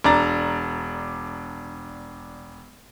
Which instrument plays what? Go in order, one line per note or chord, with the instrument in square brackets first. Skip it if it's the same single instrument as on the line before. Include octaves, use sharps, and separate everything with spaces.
[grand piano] E1 D4 A#5 A6